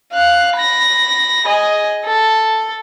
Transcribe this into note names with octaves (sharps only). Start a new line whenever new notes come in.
F5 F#6
B5 A#6
G#4 D#5
A4